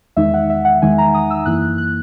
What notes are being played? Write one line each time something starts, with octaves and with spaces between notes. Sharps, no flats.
E2 D#3 G#3 D#4 E5
F#5
E5
F#5
E2 D#3 G#3 D#4 G#5
A#5
D#6
E6
F#2 E3 A#3 E4 F#6
F#6